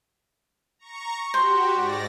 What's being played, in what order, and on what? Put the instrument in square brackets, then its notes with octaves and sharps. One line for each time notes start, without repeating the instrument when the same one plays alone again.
[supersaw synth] A#5 C#6
[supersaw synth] F#4 G4 [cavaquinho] C5
[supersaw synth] G#2 D5 A#6